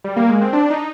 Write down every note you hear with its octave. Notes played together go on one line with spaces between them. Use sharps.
G3
A#3
G#3
C4
D4
D#4